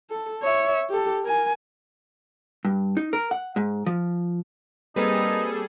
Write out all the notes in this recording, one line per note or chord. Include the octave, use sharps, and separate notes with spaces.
A4
C#5 E5
G4 A4
A#4 G#5
G2
D#4
A#4
F#5
G#2
F3
G3 A#3 C4 D#4 G#4 A4 B4